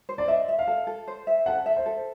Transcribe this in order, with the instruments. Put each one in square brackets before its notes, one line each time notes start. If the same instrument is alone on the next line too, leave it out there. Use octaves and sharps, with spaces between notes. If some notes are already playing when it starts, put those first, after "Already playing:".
[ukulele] C5
[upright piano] D5
[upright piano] D#5 [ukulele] E5
[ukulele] E5
[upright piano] F5
[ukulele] A4
A4
C5
E5
[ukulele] A4 [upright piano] F#5
[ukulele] E5
[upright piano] C5
[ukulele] A4